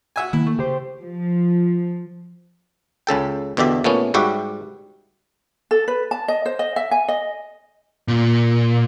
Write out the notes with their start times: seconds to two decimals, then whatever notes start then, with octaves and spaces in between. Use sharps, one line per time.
0.16 F#4 E5 G#5
0.33 D#3 A#3 E4
0.46 A3
0.59 C#3 G4 C5
1.02 F3
3.07 C#2 C#3 A4 G5
3.57 E2 B2 D3 G4 E5
3.84 A#2 A3 B3 C#4
4.14 G#2 G3 F#4 G4 E5
5.71 A4
5.88 B4
6.11 A5
6.28 D#5
6.46 C5
6.59 D#5
6.76 E5
6.91 G#5
7.08 D#5
8.08 A#2